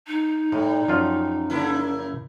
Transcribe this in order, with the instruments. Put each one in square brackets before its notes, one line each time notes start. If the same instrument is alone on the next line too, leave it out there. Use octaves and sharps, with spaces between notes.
[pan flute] D#4
[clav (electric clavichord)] A2 [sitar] G3
[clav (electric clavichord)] F#2 F3 F4
[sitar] C#3 A#3 E4